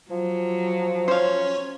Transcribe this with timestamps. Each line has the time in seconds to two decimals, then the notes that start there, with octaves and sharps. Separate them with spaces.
0.11 F3 F#3
1.08 C#4 C5 C#5 F5